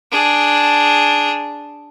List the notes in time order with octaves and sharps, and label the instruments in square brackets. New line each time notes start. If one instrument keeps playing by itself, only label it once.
[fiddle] D4 G#4